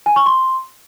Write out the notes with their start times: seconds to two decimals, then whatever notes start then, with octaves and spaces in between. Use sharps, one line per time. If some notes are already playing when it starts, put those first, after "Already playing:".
0.06 G#5
0.16 C#6
0.26 C6